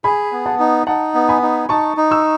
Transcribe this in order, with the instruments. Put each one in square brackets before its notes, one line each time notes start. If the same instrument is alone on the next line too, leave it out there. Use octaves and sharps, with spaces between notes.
[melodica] G#4 [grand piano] G#5 B5
[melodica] B3
[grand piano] F#5 A5
[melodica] D#4
[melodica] D#4 [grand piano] F#5 A5
[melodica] B3
[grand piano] G#5 B5
[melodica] D#4
[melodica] D#4 [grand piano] A5 C#6
[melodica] D#4
[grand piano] C#6 E6